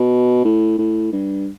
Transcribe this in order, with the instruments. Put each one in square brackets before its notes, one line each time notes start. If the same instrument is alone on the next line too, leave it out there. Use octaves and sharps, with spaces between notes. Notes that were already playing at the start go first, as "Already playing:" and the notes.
Already playing: [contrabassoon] B2
A2
A2
G2